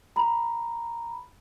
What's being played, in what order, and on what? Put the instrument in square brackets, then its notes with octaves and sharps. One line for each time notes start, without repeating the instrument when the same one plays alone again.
[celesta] A#5 B5